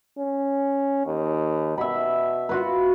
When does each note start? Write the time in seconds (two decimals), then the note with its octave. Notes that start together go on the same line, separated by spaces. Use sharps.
0.19 C#4
1.06 D#2
1.78 B2 E5 B5
2.49 F4 F#4 B4